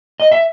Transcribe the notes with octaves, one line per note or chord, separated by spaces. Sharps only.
D#5
E5